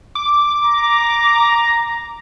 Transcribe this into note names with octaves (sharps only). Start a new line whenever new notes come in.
D6
A#5